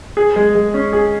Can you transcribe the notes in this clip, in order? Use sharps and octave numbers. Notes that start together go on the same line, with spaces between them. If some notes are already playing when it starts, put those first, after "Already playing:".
G#4
G#3
G#3
C#4
G#4